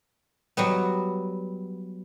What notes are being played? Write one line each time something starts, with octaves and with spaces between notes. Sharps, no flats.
F#3 G3 B3